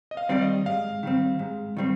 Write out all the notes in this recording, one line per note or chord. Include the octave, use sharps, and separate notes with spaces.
D#5
F5
D#3 G3 C4 D5
D#5
G#2 F5
D#3 G3 C4
G#2
D#3 G3 C4